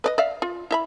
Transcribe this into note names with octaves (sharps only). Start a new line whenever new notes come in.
B4 D5 D#5
D5 E5 F5
F4
E4 E5 B5